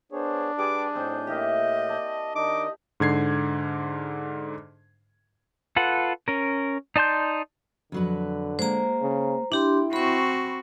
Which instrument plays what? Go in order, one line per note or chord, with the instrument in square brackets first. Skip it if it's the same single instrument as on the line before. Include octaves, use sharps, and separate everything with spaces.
[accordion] B3 G#4 C#5 [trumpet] D4 [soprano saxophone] C5
[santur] G3 G#4 [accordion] G4 B4 A5 [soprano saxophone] D6
[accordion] A2 G6 [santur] C4 D#4 [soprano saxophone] C5
[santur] A#3 E4 G4 [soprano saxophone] D#5
[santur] D5 A5
[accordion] D#3 D4 D#4 [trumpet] D#5 [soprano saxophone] D6
[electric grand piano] G#2 D3 G#6 C7
[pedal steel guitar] F4 A4 B4 F#5
C#4 A#4
D#4 D5 A5 C6 G6
[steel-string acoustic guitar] F2 F#3 B4 [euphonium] D3
[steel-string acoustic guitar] G#3 A#3 [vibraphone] C5 A#5
[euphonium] C#3
[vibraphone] D4 G4 C6 [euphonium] E4 [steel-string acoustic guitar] G5
[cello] C4 F#4 [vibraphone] B5 C#6